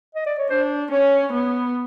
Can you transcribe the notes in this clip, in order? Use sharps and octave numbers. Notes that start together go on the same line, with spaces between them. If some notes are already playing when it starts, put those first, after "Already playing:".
D#5
D5
C#5
D4 C5
C#4 C#5
B3